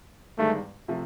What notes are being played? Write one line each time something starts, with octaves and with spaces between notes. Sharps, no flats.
G1 G2 D#3 G#3 A3
C3 F3 A3